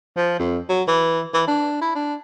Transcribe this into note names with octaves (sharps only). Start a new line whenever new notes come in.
F3
F2
F#3
E3
E3
D4
E4
D4